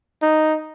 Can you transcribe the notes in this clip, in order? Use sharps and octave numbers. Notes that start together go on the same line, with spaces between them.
D#4